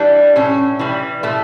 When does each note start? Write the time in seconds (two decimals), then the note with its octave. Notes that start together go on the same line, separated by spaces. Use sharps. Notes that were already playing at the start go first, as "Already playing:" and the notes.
Already playing: E3 G3 D4
0.36 A2 C#4
0.79 E3 G3
1.23 A2 A3